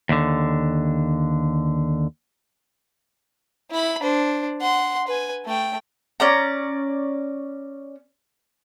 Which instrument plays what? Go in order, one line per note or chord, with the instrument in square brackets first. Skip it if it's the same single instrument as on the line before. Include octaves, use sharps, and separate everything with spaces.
[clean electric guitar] D#2 D3
[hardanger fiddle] E4 B5
D4 C5
F#5 C6
B4 G#5
A3 G5
[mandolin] C#4 D5 A#5